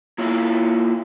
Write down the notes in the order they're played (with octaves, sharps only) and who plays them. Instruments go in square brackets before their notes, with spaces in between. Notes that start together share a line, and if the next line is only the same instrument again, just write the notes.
[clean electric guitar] A#3 E4 F4 C#5